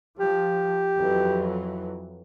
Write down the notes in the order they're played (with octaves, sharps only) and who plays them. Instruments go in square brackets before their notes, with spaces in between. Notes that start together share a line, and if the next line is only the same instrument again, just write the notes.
[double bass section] F3 [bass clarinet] G4
[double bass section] F2 E3 F#3